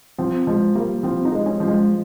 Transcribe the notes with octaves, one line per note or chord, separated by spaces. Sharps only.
F3 C4
F3 G#3
G3 A#3
F3 C4
D#4
G#3
C#4
F3
G#3